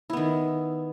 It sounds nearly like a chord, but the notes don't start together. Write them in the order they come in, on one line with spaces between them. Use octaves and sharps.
E4 B3 D#3